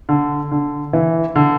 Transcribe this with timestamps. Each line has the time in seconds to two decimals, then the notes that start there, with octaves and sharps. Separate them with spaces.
0.09 D3
0.52 D3
0.93 E3
1.36 D3